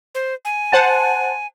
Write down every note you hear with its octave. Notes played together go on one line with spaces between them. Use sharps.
C5
G#5
C5 F#5 A5